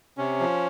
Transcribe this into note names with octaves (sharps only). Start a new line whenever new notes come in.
C3 C#4
F3